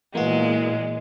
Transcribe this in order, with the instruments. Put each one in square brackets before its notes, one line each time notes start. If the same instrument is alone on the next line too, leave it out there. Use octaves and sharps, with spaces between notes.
[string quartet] A#2 G#3 [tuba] E3 [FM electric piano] A#3 B3 F#4